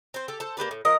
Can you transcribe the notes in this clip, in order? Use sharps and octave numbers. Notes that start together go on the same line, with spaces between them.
C4 C5
G4 A4
A4 C5
A#3 G4 B4 D5
A2
F3 A#4 D#5